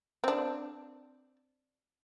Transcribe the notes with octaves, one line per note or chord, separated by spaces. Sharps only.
C4 D4